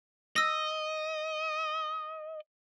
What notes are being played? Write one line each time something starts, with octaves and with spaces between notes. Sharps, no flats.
D#5 E6 A#6